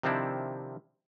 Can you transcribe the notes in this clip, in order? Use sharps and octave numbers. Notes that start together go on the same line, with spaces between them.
C3 D#3 F3 C4 D4 E4